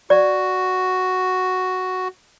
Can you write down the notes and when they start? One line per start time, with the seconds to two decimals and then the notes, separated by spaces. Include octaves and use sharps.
0.10 F#4 D5